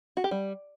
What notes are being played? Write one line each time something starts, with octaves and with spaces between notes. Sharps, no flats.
F#4
G4
G3